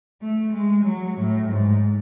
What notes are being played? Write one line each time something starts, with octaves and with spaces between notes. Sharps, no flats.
A3
G#3
F#3
A2
G#2